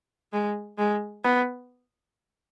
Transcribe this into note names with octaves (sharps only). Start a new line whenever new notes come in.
G#3
G#3
B3